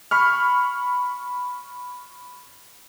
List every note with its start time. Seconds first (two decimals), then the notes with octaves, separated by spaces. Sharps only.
0.11 B5 C#6 F6